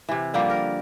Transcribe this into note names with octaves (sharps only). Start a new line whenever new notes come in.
C3 E3
D3 F3 G3 A#3
A#4